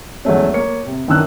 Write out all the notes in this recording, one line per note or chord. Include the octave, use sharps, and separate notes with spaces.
E2 F#3 G#3 A3 C#4
A#3 C#5 C#7
C3
F#2 D#3 E3 D4 E6 F#6